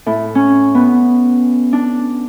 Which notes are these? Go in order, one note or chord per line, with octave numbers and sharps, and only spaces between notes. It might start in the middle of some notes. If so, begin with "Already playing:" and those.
A2
C#4
B3
D4